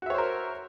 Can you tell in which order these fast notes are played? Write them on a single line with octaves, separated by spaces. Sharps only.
F#4 E5 C#5 C5 A#4